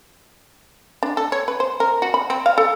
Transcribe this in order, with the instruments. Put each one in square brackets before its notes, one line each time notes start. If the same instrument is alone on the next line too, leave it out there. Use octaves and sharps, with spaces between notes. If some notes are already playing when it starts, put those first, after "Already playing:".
[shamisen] D4
A4
C#5
B4
C5
A#4
F#4
B5
C4
F5
A4